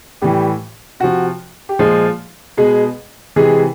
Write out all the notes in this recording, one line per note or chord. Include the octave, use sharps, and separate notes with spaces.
A2 E3 G3 G4
C3 F3 F#4
G4
A#2 F3 G#3 G#4
B2 G#3 G#4
C3 E3 G#3 G#4